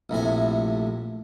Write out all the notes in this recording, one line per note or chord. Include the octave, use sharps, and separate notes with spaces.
A#1 A2 C3 G#5